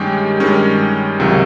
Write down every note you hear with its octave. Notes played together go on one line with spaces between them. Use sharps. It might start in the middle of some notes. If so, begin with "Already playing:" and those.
Already playing: G2 D#3 G#3 C#4 G4
G2 D#3 G#3 C#4
C#2 C3 D#3 F#3